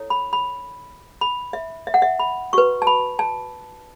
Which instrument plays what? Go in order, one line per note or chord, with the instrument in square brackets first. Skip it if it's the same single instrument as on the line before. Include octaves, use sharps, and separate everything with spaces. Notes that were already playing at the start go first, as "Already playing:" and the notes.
Already playing: [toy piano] E4 A4 C#5
B5
B5
B5
E5
E5
F#5
E5
B5
F#4 B4 C#6
A5
B5
A5